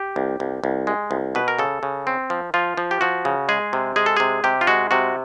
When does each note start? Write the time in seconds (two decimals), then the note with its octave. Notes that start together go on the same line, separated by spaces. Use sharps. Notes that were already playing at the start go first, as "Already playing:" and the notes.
Already playing: G4
0.16 C2
0.40 C2
0.64 C2
0.87 G#3
1.11 C2
1.35 B2 B4
1.48 A#4
1.59 C#3 A4
1.83 C#3
2.07 C4
2.30 F3
2.54 F3 F4
2.77 F3
2.91 G4
3.01 F3 F#4
3.25 C#3
3.49 G#3 G#4
3.73 C3
3.96 G#3 G#4
4.06 A4
4.17 C3 G#4
4.44 C3 G4
4.61 F4
4.67 G#3 F#4
4.91 C3 F#4